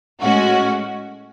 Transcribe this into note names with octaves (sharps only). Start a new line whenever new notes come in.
A2 G#3 C#4 F#4